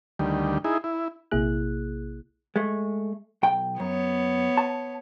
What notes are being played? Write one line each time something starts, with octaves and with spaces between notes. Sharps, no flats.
D2 D#3 G3
D#4 E4 G#4
E4
A#1 C3 A#3 E4 G#4 F#6
G#3 A3
B1 G5
F#2 B3 C#5
A5